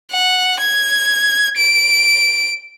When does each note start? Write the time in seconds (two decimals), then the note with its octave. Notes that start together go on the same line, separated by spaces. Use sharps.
0.11 F#5
0.60 G#6
1.57 D7